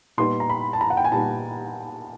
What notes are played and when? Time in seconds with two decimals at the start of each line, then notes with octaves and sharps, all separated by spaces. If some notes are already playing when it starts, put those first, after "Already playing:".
0.18 A#2 G3 B3 D#4 C6
0.40 A#5
0.49 B5
0.73 A5
0.81 A#5
0.90 F#5
0.97 G5
1.05 G#5
1.12 A#2 G3 B3 D#4 A5